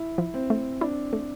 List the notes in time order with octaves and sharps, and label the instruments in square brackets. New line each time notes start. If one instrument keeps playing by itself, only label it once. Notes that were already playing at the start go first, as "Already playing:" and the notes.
Already playing: [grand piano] E4
[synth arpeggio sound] F3
[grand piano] C4
[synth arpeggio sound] A3
[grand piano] D4 [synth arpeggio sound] E4
[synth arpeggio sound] A3